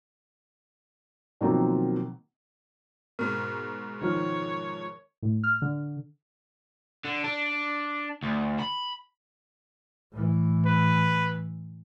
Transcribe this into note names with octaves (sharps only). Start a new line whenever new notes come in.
B2 D#3 F3 F#3 A#3 C4
G#2 B2 A#4
D#3 F3 C#5 F6
A2
F6
D3
D3
D4
D2
B5
A2 E3
B4